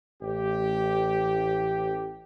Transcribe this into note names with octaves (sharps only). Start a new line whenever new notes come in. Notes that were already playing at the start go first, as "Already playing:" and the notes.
A1 G4